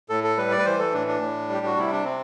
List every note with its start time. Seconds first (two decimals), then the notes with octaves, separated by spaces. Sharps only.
0.10 A2 A4
0.24 A4
0.37 G3 B4
0.51 D5
0.59 B4
0.65 E3 C5
0.79 A4
0.93 A2 D4
1.07 D4
1.21 A2
1.49 G3 G4
1.66 F#4
1.77 C3 E4
1.92 D4
2.04 C4